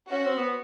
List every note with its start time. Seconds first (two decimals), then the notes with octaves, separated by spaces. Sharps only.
0.09 C#4 F#4
0.26 C4
0.38 B3